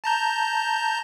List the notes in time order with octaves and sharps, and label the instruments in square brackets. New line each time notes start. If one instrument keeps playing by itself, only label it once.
[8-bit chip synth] A5 A#5 G6